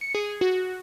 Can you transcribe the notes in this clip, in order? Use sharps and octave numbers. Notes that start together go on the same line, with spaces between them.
C#7
G#4
F#4